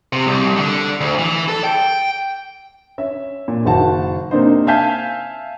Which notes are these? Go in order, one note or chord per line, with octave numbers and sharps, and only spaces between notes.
C3
C2
D3
D2
E3
A4
G5
C#4 E5
A#2
F#1 D#3 F#4 A5
C3 A#3 D4 D#4 C5
E5 F5 G#5 A5 G6 B6